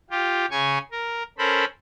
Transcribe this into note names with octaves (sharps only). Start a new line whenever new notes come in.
F4 G4
C#3 G#5 C#6
A#4
C#4 A4 A#4 C5 B5